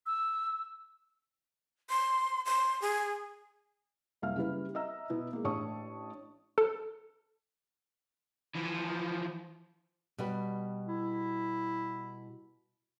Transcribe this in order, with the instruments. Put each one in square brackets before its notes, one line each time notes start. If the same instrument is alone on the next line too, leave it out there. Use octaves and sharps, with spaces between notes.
[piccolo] E6
[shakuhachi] C6
C6
G#4
[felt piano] F#1 C2 E5 F5 F6
C#3 G3 E4 B4
D#5 E5 A#5 E6
B2 B3 E4
G#3 A#3
A1 D4 C#5 A5 C#6 D#6
[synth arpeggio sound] A4
[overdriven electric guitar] E3 F3
[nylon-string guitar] B2 G3 B4
[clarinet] E4